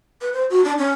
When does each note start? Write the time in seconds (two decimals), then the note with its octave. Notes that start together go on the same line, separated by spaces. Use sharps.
0.21 B4
0.33 C5
0.50 F#4
0.64 D4
0.78 C#4